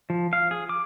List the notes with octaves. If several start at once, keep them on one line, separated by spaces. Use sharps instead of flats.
F3
F5
G#4
D6